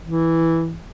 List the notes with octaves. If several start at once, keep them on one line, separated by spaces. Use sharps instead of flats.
E3